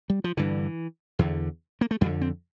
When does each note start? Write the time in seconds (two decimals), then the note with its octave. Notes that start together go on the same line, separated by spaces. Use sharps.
0.10 G3
0.24 F3
0.37 G2 D3 E3
1.19 E2 D3
1.81 A#3
1.91 A3
2.01 F2 D3 G3
2.21 C4